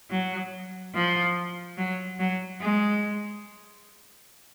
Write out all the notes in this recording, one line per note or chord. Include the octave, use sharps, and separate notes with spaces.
F#3
F3
F#3
F#3
G#3